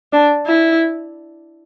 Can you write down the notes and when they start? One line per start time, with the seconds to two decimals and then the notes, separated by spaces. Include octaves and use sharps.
0.12 D4
0.46 E4